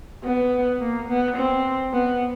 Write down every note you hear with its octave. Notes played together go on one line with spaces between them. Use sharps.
B3
A#3
B3
C4
B3